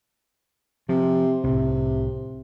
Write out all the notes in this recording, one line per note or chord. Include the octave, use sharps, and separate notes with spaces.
C3 F3
C2 A2 C3